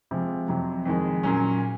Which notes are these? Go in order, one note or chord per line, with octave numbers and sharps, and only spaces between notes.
C3 F3 G#3
F2 C3 F#3
F2 D#3 G#3
A#2 F#3 C#4